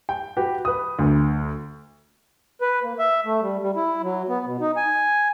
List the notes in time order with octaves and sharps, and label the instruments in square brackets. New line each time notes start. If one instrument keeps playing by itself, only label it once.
[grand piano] G5
F#4 G4 B4
B4 D#6
D2
[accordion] B4
A#3
E5
A3
G3
G3
E4
F#3
B3
B2
D#4
G#5